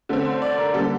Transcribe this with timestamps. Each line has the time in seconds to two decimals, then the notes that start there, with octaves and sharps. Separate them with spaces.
0.09 D3 A3 C4
0.25 C5
0.42 D5
0.58 A#4
0.74 D3 G3 A#3 A4